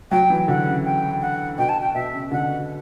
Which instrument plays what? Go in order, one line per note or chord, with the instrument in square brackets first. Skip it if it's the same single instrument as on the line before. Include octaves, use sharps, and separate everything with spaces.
[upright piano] F#3 [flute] G5
[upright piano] E3
[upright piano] D3 [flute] F#5
[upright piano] C#3
[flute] G5
F#5
[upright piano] B2 [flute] G5
[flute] A5
G5
[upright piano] B2 [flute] E5
[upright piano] C#3
[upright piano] D3 [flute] F#5